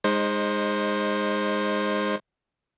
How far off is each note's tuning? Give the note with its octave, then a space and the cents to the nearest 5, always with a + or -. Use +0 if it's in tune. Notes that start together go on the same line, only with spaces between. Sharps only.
G#3 -15 D#4 +0 C5 +15